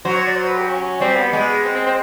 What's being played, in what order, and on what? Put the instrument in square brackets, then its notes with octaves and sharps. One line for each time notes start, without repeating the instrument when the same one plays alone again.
[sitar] F#3 [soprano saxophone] C5
[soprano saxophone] C#5
D5
C5
B4
G4
C#4
[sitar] G3 [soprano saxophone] C4
[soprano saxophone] B3
[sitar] G#3
[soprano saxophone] C4
C4
C4